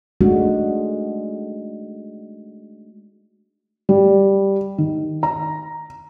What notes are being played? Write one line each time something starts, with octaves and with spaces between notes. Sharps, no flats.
G#3 A3 D4 D#4 F#4
G3
D#3
A#5